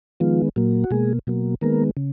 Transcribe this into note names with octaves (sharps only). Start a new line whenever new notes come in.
D#3 F3 G#3 B3 F4
A#2 F#3 A#3
F#4
B2 G#3 A#3 G#4
B2 F#3 A#3
D#3 G#3 A#3 B3 A#4
C#3